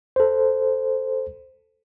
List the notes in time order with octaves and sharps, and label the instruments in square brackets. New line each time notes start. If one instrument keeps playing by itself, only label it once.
[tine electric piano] A4 C5